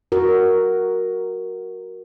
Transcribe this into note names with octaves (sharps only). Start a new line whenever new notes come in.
F#4 A#4